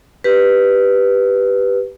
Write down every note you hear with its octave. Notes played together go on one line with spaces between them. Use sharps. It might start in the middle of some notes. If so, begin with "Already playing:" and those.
G4 B4